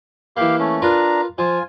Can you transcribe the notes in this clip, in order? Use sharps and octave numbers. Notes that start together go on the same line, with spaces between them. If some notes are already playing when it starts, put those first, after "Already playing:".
E3 A#3 G4 F5
A3 C#4
D4 F4 A#4 B4 A#5
F3 F4 G#5